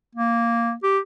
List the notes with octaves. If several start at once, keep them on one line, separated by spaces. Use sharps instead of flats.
A#3
G4